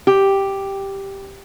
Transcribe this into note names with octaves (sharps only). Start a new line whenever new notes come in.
G4